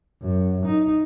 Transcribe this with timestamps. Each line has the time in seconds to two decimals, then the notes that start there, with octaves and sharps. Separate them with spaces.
0.22 F#2
0.66 D#4